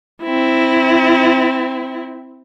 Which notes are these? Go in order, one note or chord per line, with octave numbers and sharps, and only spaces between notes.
C4 E4